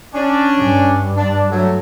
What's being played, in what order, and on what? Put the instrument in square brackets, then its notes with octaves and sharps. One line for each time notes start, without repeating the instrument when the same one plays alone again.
[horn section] C#4 D4
[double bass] G2
[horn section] D4
F#3 A3